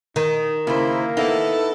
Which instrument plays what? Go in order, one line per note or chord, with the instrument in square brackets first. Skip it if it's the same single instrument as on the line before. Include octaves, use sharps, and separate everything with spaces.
[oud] D#3 [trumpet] D#4
[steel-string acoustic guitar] C#3 C5 [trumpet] A#3 [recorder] E4
[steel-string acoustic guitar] B3 D#4 E4 [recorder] A4